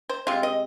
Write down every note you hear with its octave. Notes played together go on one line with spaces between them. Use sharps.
C5
C3 G#3 F4
D#5